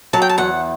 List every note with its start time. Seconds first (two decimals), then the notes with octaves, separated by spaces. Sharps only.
0.13 F#3 A5
0.22 G5
0.29 A5
0.38 E2 F#5